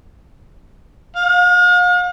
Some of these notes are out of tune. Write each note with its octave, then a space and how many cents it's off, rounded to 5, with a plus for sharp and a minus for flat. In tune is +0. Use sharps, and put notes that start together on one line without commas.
F5 +45